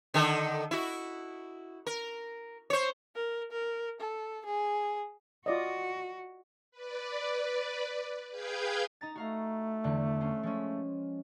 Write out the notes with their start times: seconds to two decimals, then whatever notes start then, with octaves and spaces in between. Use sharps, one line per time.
0.14 D3 D#3 A4
0.71 E4 F#4
1.86 A#4
2.70 C5 C#5
3.15 A#4
3.51 A#4
4.00 A4
4.46 G#4
5.46 F4 F#4 D5 D#5
6.71 B4 D5
8.31 G#4 B4 F5 G5 G6 G#6
9.01 D#4 A#5 A6
9.16 A3 F#4 F5 A#5
9.84 E2 D3 F#6
10.21 C#4 F4
10.43 F3 G#3 C#4